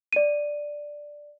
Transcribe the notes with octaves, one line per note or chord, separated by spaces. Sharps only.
D5 D#7